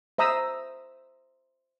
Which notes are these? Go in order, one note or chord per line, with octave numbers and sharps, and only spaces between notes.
C5 E5 A#5 D#6 E6